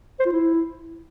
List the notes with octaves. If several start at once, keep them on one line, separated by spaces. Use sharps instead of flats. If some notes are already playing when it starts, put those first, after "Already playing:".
C5
F4
E4